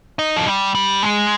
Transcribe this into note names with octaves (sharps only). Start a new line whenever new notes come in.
D#4
F3
G3
G3
G#3